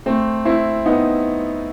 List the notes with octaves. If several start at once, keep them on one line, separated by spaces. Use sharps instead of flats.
A3 C4
C4 E4
B3 D#4